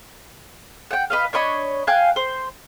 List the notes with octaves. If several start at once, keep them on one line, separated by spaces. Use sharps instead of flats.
F#5 G5
B4 D#5 F5
D4 C#5 D#5 B5
F5 G5 G#5 F#6
C5